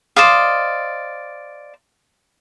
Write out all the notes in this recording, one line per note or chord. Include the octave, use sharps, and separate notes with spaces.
C5 D5 D#5 F5